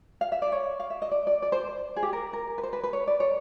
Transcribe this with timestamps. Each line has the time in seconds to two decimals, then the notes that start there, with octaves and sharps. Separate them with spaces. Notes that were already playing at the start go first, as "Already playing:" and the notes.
0.21 F5
0.32 E5
0.42 D5
0.52 C#5
0.80 F5
0.90 E5
1.02 D#5
1.11 D5
1.27 D5
1.42 D5
1.52 C5
1.96 G#4
2.03 G4
2.13 A#4
2.33 A#4
2.58 B4
2.63 C5
2.73 B4
2.83 B4
2.93 C#5
3.07 D5
3.20 C#5